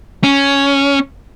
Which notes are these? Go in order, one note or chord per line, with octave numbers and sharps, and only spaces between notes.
C#4